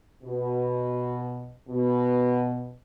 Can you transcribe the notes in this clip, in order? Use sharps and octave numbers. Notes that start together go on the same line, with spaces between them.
B2
B2